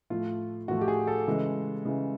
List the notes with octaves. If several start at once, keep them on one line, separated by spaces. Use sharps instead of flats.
A2 F3 A3 F4
A2 F3 A3 F#4
G4
G#4
A4
C#3 E3 G#3
C#3 E3 G#3